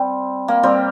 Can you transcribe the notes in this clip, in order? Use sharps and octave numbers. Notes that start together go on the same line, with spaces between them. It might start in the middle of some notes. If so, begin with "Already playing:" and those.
Already playing: G3 C4
A#3
G3 C4